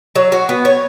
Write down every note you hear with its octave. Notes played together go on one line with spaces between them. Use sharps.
F#3
F#4
B3
C#5